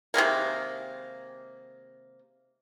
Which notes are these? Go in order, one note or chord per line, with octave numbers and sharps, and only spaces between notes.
C3 D#3 G#3 A#3